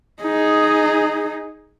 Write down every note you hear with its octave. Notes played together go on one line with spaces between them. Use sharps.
D#4 G#4